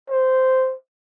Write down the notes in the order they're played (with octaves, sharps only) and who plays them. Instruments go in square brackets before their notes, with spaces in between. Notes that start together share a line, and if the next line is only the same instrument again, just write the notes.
[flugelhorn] C5